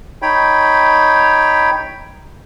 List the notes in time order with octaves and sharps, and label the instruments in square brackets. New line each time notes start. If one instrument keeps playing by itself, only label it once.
[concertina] D#4 C#5 G5 B5